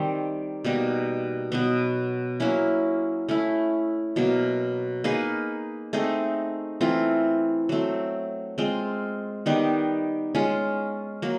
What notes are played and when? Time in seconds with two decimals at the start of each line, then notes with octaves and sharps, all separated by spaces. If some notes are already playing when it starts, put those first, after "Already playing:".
Already playing: D#3 G3 C4
0.64 B2 G3 A#3 D#4
1.52 B2 F#3 B3
2.40 F#3 A#3 C#4 E4
3.29 A3 C#4 E4
4.16 B2 F#3 A#3
5.04 A#3 D#4 G#4 B4
5.93 A3 C4 D#4 G#4
6.81 E3 A3 C4 F4
7.69 F#3 A3 C4
8.58 G#3 C4 F4
9.46 D#3 G3 B3 D#4
10.35 G#3 C#4 F4
11.22 F#3 A#3